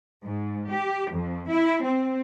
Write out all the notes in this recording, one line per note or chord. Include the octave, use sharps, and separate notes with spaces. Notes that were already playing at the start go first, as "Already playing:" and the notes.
G#2
G4
F2
E4
C4